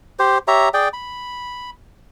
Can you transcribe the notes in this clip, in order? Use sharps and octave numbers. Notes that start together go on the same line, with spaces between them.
G4 C5
G4 C#5 E5 A#5
G#4 D5 G5
B5